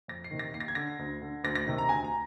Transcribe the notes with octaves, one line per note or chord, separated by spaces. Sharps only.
F2 A#6
C7
C3 D#3
A#6
D#2 C7
A#6
G#6
D3 A#6
D2
D3
D2 A#6
A#6
C3 D#3
A#5
D2 G#5
A#5